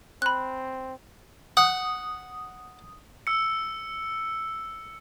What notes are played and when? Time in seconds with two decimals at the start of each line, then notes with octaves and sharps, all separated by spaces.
0.22 C4 B5 F#6
1.57 F#5 D#6
3.27 E6 C#7